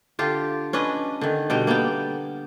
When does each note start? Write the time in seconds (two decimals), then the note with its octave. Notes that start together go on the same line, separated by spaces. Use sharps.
0.19 D3 F4 G4
0.73 C#4 D4 B4 D#5
1.21 D3 D#3
1.50 B2 D3 G3 G5
1.67 A#3 B3 D5 G5